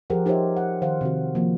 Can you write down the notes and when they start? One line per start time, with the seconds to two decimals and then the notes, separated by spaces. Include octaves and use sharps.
0.10 F3 G4 G#4 A#4 C5 F#5
0.26 D#4 G4 A#4 C5 C#5 E5
0.57 F#5
0.82 D#3 C5 F5 F#5
1.01 C3 D#3 F#4
1.35 F3 A#3